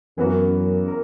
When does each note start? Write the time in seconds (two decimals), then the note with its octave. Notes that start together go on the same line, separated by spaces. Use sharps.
0.18 F#2 E3 B3 F#4 A#4
0.88 A#4